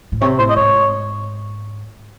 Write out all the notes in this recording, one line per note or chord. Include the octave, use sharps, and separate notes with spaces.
A2
C3 C#5
A2 C5
D#5
G#2 C#5